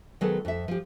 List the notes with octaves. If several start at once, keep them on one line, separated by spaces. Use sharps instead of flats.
D#3 F#3 G#3 B3 G#4 A4
F2 E5
F3 G4